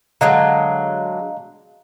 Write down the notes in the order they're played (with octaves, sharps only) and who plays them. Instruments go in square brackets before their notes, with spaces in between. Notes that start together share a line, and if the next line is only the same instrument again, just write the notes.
[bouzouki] D3 F#3 G#3 [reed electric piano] D#5 F5 A#5